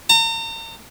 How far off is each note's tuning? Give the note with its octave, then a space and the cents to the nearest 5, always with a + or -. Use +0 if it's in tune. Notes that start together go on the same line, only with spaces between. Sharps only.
A#5 -40